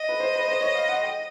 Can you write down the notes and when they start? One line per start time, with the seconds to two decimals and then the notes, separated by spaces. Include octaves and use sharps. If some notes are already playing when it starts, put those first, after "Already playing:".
Already playing: D#5
0.09 B4
0.20 C5
0.35 B4
0.48 C5
0.61 C#5
0.75 F5
0.89 F#5
1.03 G5